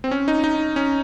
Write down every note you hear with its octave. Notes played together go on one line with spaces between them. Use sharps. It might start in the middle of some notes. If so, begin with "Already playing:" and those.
C4
C#4
D#4
D#4
C#4